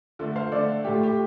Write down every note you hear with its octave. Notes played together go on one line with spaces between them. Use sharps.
D3 A3 F4
C5 F5
D3 A3 A4 D5
A2 A3 G4
F4
G4